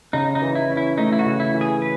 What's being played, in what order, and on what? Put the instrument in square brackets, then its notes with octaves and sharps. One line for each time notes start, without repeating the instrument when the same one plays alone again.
[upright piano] C#3 [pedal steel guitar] D#4
[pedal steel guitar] D#4
[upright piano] E3
[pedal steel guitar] E4
[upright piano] C#4
[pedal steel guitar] E4
[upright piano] A3 [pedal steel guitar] D#4
[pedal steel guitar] E4
F#4
[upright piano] C#3
[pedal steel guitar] E4
[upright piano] E3
[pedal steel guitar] G#4
B4